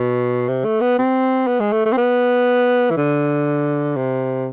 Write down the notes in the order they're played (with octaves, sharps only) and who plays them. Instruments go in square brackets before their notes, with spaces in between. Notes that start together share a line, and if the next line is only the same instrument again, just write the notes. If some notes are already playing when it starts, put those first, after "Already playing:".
Already playing: [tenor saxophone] B2
C3
A3
B3
C4
B3
G#3
A3
A3
C4
B3
E3
D3
C3